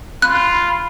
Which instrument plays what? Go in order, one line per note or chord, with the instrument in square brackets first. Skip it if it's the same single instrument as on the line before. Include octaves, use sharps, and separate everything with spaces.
[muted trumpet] F4 [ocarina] B5 [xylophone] F#6